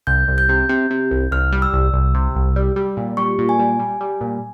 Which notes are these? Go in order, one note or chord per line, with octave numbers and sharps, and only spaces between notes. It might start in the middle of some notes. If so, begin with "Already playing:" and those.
C2 G6
C2
G6
C3
C3
C3
C2
C2 F6
G3
E6
C2
C2
C3
C2
G3
G3
A#2
G3 C#6
A#2
G#5
G3
G3
G3
A#2